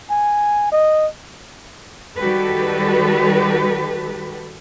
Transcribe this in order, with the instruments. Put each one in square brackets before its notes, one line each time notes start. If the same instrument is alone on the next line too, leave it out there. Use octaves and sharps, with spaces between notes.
[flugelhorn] G#5
D#5
[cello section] D#3 G3 F#4 G4 A4 B4